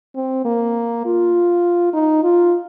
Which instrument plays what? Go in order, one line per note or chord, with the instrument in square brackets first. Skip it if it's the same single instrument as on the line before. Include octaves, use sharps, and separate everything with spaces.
[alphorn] C4
A#3
F4
D#4
F4